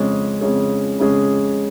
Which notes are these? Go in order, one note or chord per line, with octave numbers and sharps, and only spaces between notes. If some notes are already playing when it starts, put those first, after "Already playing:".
Already playing: F2 C#3 G#3 C#4 G#4
F2 C#3 G#3 C#4 G#4
F2 C#3 G#3 C#4 G#4